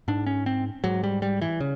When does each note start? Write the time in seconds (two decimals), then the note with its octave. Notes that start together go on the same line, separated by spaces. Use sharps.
0.08 G#2 D4
0.27 C#4
0.46 C4
0.84 G#2 F#3
1.04 G3
1.22 G3
1.41 E3
1.60 C#3